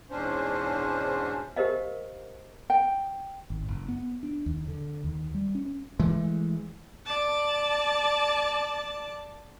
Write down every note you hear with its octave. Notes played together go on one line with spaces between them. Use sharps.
E2 G#2 B2 C#4 D4 C5
G4 A#4 C5 D#5 F5
G5
G#1
F#1
B3
D4
D#2
D3
D#2
G3
C#4
E3 G#3 A3
D5 A5